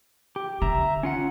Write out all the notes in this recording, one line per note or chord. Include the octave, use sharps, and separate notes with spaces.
G4
D3 E5 A#5
C#4 F4 F#5